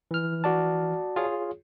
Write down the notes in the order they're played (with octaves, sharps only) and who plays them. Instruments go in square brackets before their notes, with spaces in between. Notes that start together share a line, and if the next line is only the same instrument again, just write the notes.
[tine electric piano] E3 F6
[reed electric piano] F#4 D5 A5
[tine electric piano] F4 G#4 C#5